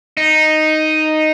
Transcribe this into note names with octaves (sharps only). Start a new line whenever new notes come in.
D#4